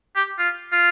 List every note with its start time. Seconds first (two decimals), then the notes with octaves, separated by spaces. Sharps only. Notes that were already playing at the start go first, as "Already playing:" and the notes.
0.16 G4
0.39 F4
0.72 F4